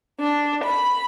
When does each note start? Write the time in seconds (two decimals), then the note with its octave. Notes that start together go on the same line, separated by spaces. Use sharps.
0.19 D4
0.65 B5